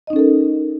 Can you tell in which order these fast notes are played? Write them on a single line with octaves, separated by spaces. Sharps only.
D#5 D#4 C#4 A4 A#4